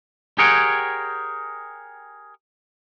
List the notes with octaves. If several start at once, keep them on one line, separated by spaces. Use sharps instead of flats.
G4 G#4 A#4 C#5 F#5 G5